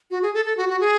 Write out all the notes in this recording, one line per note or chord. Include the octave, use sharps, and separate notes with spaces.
F#4
G#4
A4
A4
F#4
F#4
G#4